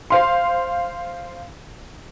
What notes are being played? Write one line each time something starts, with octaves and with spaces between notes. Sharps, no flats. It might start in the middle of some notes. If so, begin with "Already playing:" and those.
C5 F5 C6